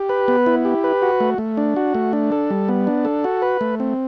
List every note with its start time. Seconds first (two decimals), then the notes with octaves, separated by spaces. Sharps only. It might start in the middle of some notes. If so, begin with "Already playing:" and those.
Already playing: G4
0.09 B4
0.28 B3
0.46 E4
0.65 G4
0.84 B4
1.02 F#4
1.20 A3
1.38 A3
1.57 D4
1.76 F#4
1.95 A3
2.13 D4
2.32 A4
2.50 G3
2.69 B3
2.87 D4
3.05 A4
3.24 F#4
3.42 B4
3.61 A3
3.80 C4